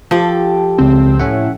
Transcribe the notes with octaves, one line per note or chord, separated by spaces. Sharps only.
F3 G4 A4
C#2 C#3 C4
A2 C#4 E5 F#5